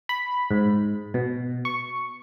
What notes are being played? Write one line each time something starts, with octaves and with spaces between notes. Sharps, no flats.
B5
G#2
B2
C#6